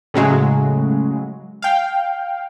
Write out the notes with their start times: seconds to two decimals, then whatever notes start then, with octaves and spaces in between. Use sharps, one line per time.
0.14 A2 C#3 F#3 G#3
1.62 F5 G5